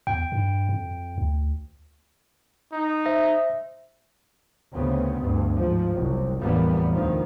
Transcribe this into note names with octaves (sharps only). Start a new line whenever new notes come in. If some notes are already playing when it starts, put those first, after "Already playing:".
E2 G5
G2
F2
D2
D#4
C5 E5 A#6
D2 C#3 B3 C4
D2 G2
G#2 F3
F#1 C2
F1 E2 A2 G3 A#3 B3
D2 D#3 F3